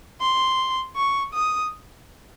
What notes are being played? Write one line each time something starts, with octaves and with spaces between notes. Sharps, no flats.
C6
C#6
D#6